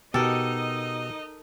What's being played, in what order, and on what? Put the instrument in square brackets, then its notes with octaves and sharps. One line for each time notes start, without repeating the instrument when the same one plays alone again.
[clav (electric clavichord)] B2 G4 [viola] D#4 D#5 [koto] A4 A#4